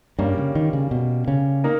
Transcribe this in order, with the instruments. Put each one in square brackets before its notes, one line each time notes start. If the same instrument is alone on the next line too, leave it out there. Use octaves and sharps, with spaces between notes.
[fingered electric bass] G2 [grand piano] G3 A#3 C#4
[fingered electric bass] C#3
D#3
C#3
B2
C#3
[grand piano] A#3 D#4 A#4